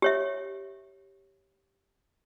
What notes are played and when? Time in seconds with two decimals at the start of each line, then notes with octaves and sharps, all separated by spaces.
0.02 G4 C#5 E5